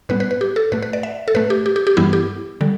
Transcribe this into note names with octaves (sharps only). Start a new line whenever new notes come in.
A2 G3 B3 B4
B4
B4
G4
A4
A2 A3 B4
B4
D5
E5
A4
A2 A3 B4
G4
G4
G4
G4
G2 E3 G3 B3 E4
G4
D3 G3